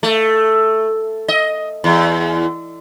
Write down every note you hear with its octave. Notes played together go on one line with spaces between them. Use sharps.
A3
D#5
E2